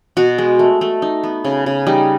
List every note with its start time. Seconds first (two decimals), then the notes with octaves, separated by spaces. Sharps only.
0.17 B2 F#4
0.38 G#3
0.59 A3
0.81 A3
1.02 D#4
1.24 B3
1.45 C#3
1.66 C#3
1.87 G3 D#4